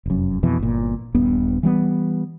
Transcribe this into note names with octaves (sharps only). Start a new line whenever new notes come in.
F1 F#2
F2 B2 E3
G1 A#2
D#1 G2 B3
E3 G3 B3